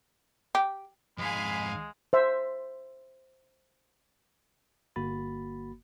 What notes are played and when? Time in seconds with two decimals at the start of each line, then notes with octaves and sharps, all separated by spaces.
0.55 G4
1.18 F2 G#2 G#3 F5 G#5 B5
2.13 C5 E5
4.96 G1 A#3 F#4 B5 A6